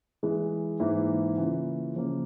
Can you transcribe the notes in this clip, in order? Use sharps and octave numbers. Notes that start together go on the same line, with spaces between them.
E3 G#3 E4
G#2 E3 A#3 E4
C#3 E3 A#3 F4
C#3 F3 A#3